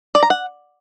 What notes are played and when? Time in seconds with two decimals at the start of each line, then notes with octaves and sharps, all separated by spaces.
0.15 D5
0.23 A#5
0.30 F#5